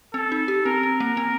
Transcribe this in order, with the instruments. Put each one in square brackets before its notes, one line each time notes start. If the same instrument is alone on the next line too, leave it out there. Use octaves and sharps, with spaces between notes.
[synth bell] C4 [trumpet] A4
[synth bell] D#4
G4
[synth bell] C4 [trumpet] A#4
[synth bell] C4
A#3
C4